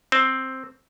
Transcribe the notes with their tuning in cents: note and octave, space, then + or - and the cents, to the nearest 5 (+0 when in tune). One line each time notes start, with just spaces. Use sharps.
C4 +5 C5 +0